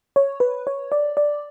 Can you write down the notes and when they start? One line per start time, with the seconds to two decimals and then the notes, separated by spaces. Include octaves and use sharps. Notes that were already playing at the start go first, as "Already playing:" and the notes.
0.16 C#5
0.40 B4
0.67 C#5
0.92 D5
1.17 D5